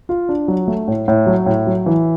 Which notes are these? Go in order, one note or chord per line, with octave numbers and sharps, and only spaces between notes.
F4
D4
F#3
A3
A2
A2
F#3
A2
F#3
E3